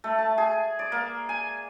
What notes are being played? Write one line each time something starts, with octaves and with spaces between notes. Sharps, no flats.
A3
A5
G#4
D5
A#3
G#5